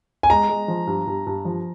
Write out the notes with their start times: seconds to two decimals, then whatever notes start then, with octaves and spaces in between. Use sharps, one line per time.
0.23 G#5
0.30 G#3 A#5
0.49 G#3
0.68 F3
0.87 G2
1.07 G2
1.27 G2
1.45 F3